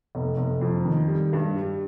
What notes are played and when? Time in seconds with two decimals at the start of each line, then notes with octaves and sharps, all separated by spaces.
0.15 F1
0.37 F1
0.61 F2
0.85 D#3
1.08 G3
1.33 G2
1.56 G3